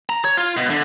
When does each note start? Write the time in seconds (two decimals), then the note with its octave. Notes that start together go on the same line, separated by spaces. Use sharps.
0.09 A#5
0.24 C#5
0.37 F4
0.57 B2
0.70 D3